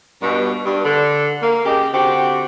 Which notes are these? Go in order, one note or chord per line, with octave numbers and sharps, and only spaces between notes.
G2 B2
G2
D3
A#3
C#3 G#3 G4
D3 C4 F#4 G4